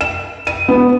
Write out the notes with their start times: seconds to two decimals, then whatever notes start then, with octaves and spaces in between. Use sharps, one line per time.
0.01 E7
0.47 D#7
0.68 B3